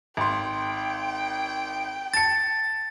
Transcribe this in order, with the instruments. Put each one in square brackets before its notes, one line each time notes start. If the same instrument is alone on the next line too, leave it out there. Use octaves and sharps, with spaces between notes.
[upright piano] G#1 C6 [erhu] G5
[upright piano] A5 C#7 [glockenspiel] A6